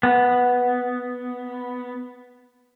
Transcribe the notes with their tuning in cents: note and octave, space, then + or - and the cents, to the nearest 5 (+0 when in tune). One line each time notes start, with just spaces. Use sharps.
B3 +0